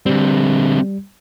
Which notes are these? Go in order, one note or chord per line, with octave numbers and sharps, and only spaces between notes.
D3 G3 C4